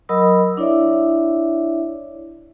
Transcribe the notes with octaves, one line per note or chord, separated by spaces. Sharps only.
F#3 A#4 D#5 B5 D#6 E6
D4 E4 C#5 D5 E5